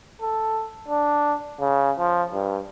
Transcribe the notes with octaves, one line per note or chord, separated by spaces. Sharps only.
A4
D4
C#3
F3
G2